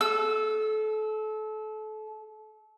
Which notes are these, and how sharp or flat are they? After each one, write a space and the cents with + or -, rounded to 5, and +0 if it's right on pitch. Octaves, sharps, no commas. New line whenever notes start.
A4 -30 E6 +0